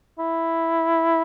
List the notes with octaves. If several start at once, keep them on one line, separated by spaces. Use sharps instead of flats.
E4